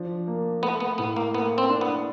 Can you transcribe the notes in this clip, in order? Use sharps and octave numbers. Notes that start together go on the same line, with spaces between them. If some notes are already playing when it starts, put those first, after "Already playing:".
Already playing: F3 D4
A#3
A3 B3
B3
A2 B3
A#3
A#3 B3
C4
D4
B3